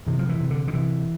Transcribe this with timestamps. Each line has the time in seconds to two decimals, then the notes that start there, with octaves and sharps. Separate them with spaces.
0.07 C3 E3
0.19 F3
0.29 E3
0.40 C3
0.51 D3
0.68 D3
0.73 C3 E3